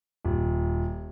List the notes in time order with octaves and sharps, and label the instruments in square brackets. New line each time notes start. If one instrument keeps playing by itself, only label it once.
[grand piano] D#1